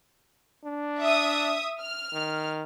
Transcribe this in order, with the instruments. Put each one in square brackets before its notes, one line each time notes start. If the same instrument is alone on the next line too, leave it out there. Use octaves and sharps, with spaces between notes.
[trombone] D4
[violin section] E5 D#6
F6
[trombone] D#3